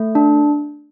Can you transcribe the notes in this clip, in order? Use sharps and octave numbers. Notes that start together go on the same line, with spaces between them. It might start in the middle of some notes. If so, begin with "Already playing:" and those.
Already playing: A3
D4